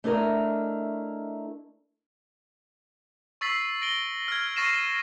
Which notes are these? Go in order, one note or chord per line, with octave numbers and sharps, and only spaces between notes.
A3 D4 E4 A#4 D#5
C#6 E6 A6 B6 C7 F#7
A#6 D7 G7
F6 G#6
C#6 A6 A#6 C7 D#7 E7